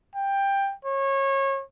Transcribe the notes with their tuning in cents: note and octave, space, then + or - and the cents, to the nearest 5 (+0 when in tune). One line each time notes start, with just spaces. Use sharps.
G5 +15
C#5 -25